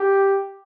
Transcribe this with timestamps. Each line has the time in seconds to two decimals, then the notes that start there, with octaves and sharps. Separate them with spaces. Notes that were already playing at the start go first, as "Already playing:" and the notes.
Already playing: G4